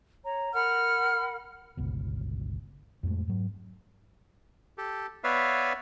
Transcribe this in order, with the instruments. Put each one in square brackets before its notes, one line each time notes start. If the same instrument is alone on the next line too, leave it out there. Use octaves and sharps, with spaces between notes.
[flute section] C#5 A#5
[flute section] A#4 F#5 B5 [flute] F6
[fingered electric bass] G1 C#2 B2
F2 A2 G#3 A3
G#2 F#3
[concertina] G4 A4
B3 B4 C#5 D5 E5 F5